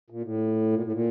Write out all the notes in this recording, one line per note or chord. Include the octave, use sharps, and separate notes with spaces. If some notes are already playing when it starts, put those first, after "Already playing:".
A#2
A2
A#2
A2
A#2